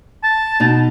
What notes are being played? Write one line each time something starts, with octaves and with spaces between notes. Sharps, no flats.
A5
B2 D#4